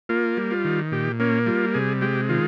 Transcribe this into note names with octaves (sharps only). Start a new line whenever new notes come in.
A#3 F4
G3
F4
D#3
A#2 G4
A#3 C#4
G3 F4
C3 G#4
G#3 G4
D#3 F4